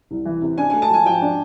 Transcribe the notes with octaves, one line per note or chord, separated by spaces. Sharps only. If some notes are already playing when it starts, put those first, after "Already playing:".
C2
E3
C3
D4 G#5
A3 G#5
A5
F3 G#5
F3 G5
D4